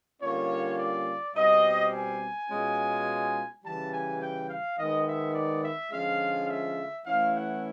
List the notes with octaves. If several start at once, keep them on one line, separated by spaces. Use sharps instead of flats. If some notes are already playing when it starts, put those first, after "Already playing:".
D3 G3 A#3 C#4 F4 C#5
D5
B2 G3 C4 D#5
G#5
B2 G#3 C#4 F4
C#3 E3 G3 A5
G#5
G5
F5
D#3 G#3 B3 D#4 D#5
E5
D5
E5
D3 F3 G#3 C#4 F4 F5
E5
E3 A3 C#4 E4 F5
F#5